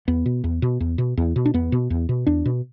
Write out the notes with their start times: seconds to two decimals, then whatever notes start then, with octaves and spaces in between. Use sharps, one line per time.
0.08 E2 B3
0.26 B2
0.44 E2
0.62 B2
0.80 E2
0.98 B2
1.17 E2
1.36 B2
1.45 D4
1.54 E2 B3
1.72 B2
1.90 E2
2.09 B2
2.27 E2 D4
2.45 B2